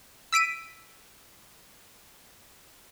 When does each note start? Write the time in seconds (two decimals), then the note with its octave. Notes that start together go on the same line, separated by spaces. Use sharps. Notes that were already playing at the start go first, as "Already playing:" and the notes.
0.33 E6 B6 D7 D#7